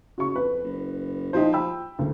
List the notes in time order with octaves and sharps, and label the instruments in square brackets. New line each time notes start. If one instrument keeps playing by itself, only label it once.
[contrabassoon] C#3 [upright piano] F#4 C#6
[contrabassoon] F2 [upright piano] B4
[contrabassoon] F#1
[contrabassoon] F3 [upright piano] D#4 G4 C5
[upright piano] G5 B5 E6
[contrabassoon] F#1 [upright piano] D2